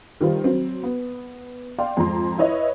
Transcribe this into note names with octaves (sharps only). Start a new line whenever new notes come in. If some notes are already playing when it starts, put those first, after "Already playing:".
D#3 G3 F4 C5
F#3 C4
B3
D5 F5 G5 C6
F2 G#2 A#5 C6
E4 B4 C#5 D#5 E5